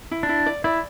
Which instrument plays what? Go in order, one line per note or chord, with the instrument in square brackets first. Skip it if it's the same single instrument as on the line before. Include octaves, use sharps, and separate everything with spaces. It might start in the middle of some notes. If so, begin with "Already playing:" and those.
[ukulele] E4
[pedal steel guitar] D4
[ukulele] E4
D5
[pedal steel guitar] E4 [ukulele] D5